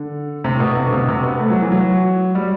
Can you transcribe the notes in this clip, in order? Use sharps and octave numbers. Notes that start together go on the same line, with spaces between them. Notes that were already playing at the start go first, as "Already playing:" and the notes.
Already playing: D3
C3
A2
B2
C3
D3
C3
B2
C3
B3
A3
F#3
E3
F#3
G3